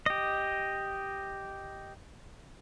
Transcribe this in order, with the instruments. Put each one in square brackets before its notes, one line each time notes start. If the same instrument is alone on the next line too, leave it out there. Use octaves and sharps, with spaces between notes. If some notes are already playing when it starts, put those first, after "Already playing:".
[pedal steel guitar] G4 D#5